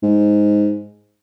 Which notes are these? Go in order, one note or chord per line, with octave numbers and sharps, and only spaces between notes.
G#2